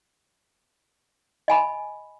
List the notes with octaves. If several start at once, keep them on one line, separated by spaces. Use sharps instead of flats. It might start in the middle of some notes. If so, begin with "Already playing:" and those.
D#5 G#5 B5